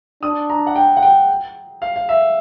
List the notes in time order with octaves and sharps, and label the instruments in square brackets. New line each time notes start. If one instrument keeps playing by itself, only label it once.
[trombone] D4 [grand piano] D#6
[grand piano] A#5
F#5
G5
F#5
G5
F5
F5
E5